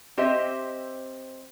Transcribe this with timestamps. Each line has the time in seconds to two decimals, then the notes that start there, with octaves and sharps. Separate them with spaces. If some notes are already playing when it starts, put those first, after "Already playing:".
0.17 C4 G4 C5 D#5 E5